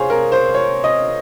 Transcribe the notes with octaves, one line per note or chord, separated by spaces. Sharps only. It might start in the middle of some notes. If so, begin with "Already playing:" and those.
Already playing: C3 G#4 C5 C#5 F5
A#4
C5
C#5
D#5